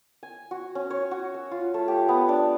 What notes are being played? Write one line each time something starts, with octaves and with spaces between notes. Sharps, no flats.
G#5
F#4
C#4
C#5
F#4
E6
F4
A3
G4
B3
D4